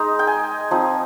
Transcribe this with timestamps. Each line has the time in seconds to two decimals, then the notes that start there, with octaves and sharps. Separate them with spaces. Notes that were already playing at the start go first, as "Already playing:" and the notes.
Already playing: G#3 D#4
0.19 G5
0.27 G#5
0.71 F3 C4 D#4